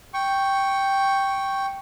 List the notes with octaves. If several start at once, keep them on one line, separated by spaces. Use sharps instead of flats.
G5 C#6